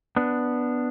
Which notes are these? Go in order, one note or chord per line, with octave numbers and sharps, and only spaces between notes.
B3 D4